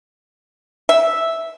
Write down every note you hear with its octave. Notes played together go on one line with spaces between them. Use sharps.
E5